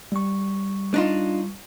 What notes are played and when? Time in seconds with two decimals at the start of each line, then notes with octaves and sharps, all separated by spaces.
0.12 G3 C#6
0.94 D4 D#4 F4